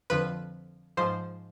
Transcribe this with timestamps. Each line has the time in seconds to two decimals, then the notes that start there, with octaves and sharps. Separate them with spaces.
0.10 F2 D3 F3 B4
0.97 G#2 F3 C5